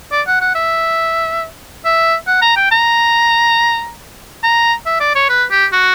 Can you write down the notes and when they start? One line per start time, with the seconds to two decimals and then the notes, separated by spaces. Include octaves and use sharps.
0.11 D5
0.27 F#5
0.41 F#5
0.55 E5
1.85 E5
2.27 F#5
2.42 A#5
2.56 G5
2.71 A#5
4.43 A#5
4.86 E5
5.00 D5
5.15 C#5
5.29 B4
5.51 G4
5.72 F#4